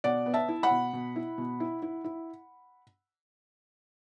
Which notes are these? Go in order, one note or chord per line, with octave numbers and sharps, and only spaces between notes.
B2 D5 F#5
B3
E5 A5
E4
F#5 B5
B2
B2
E4
B2
E4
E4
E4